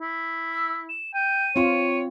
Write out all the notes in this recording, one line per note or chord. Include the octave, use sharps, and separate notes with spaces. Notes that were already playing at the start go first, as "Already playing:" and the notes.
E4
E6
E7
G5 D#7
C4 F4 C#5